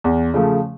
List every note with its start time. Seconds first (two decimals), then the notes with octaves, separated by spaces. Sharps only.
0.04 E2
0.34 C#3 F3 A3